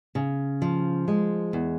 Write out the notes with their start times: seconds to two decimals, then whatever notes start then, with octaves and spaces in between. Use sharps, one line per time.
0.15 C#3
0.62 F3
1.08 G#3
1.53 E2